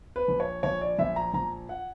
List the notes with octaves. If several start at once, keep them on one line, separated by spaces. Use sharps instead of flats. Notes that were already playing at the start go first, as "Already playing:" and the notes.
B4
A#1
C#5
A#1 C#5
D5
A#1 E5
A#5
A#1 A#5
F#5